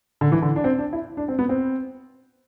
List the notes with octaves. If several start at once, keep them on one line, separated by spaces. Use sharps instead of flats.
D3
E3
D3
D4
C4
D4
E4
D4
C4
B3
C4